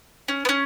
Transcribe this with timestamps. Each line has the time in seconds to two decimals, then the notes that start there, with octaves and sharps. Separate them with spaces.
0.28 C#4
0.45 B3
0.49 C#4